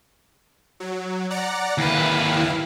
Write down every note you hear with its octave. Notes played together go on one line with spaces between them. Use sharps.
F#3
D5 F#5 A#5
D#2 E4 B4 F5